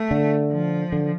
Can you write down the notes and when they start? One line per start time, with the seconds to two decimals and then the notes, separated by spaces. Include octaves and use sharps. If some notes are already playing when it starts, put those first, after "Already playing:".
Already playing: A3
0.11 D3
0.52 F3
0.92 D3